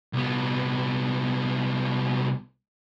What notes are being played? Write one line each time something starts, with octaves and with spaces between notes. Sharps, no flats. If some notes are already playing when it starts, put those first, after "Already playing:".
C2 B3